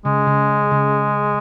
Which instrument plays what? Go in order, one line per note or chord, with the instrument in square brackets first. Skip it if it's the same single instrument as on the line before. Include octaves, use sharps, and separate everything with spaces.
[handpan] C#3 [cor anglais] G#3
[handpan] C#3
C#3